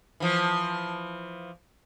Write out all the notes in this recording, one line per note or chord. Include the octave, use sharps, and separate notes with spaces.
E3 F3